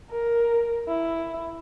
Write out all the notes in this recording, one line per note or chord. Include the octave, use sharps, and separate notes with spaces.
A#4
E4